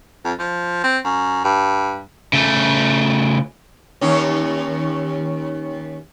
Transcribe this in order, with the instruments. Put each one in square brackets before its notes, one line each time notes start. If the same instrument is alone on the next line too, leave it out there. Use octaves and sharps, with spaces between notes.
[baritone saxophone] F2
F3
C4
F#2
G2
[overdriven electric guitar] C#3 A3
[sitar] D#2 C#4